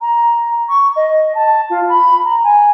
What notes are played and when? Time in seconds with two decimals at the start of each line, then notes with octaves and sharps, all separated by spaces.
0.01 A#5
0.69 C#6
0.96 D#5
1.35 A5
1.70 F4
1.89 B5
2.25 A#5
2.44 G#5